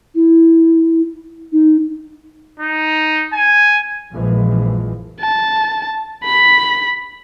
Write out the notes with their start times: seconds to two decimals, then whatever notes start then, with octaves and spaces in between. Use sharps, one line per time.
0.15 E4
1.52 D#4
2.59 D#4
3.33 G#5
4.13 A#1 F#2 A#2 E3 F3 G#3
5.21 A5
6.24 B5 B6